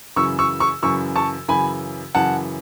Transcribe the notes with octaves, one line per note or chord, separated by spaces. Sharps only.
F#2 C#3 E3 C#6 E6
C#6 E6
C#6 E6
F#2 C#3 E3 C#6 E6
A5 C#6
F#2 C#3 E3 G#5 B5
F#2 C#3 E3 F#5 A5